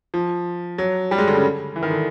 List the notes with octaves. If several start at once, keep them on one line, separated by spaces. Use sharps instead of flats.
F3
F#3
G3
G#3
D3
C#3
E3
D#3
D3